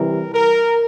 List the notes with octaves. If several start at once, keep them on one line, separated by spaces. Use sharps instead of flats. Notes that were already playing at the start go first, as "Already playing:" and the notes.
Already playing: C3 E3 G3 A#4
A#4